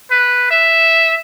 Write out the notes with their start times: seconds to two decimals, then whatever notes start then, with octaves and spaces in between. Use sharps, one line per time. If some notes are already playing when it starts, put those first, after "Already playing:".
0.11 B4
0.51 E5